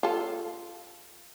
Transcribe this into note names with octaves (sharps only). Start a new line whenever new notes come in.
F4 A4